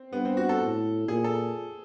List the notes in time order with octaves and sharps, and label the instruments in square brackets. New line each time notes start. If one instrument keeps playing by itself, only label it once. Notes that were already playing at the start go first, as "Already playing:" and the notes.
Already playing: [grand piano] C4
[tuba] G2 [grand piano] B3
[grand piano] C4
F#4
A4
[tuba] A2
[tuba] A#2 [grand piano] G#4
[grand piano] A4